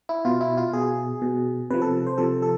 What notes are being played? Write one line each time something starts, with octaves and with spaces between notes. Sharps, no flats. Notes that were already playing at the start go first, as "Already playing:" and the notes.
E4
B2 F4
E4
F4
B2 G#4
B2
C3 F3 B4
A4
C5
C3 F3 A4
A4